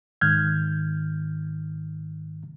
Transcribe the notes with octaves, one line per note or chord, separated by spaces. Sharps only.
G#2 D#3 F6 G6 G#6